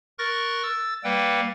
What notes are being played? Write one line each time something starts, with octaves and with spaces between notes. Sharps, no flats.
A#4 C#6 F#6 A6 A#6
E6 A6
G3 A#3 B4 F#5 G5